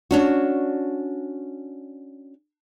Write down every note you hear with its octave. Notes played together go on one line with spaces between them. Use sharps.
C#4 D4 F#4